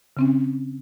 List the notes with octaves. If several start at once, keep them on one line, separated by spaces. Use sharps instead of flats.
C#3 C4 C#4